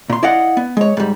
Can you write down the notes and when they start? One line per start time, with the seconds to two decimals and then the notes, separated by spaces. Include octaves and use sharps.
0.10 A#2 C6
0.23 E4 D5 D#5 F5 F#5
0.57 B3
0.77 G#3 C#5
0.97 G#2 G3